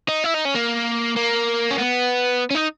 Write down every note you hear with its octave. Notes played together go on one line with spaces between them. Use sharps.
D#4
E4
D#4
C#4
A#3
A#3
C#4
B3
C#4
D#4